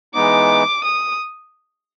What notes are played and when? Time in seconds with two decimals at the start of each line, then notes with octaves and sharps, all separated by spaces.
0.15 E3 G#3 B3 D#4 D6
0.85 D#6